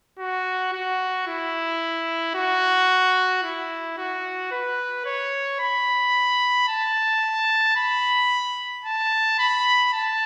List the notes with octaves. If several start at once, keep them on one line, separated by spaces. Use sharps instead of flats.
F#4
F#4
E4
F#4
E4
F#4
B4
C#5
B5
A5
B5
A5
B5
A5